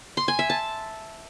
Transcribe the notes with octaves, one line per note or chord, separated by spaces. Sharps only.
C6
G#5
E5
A5